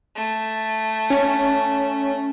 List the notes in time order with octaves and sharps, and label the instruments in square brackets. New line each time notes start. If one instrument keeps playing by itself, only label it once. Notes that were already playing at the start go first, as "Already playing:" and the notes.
[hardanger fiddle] A3
[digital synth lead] C#4